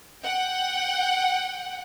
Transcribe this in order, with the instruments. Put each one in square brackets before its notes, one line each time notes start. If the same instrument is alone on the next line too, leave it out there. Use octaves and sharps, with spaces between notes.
[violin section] F#5 G5